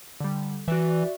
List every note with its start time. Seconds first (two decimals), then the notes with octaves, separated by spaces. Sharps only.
0.20 D3 G3
0.68 E3 F#4 D5 E5